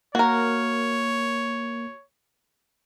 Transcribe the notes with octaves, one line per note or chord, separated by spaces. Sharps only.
A#3 F#4 A#4 C#5